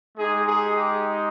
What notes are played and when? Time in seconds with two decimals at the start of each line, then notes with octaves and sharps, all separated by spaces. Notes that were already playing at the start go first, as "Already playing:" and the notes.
0.18 G#3 D#4 G4 G#4
0.46 G#4
0.75 G4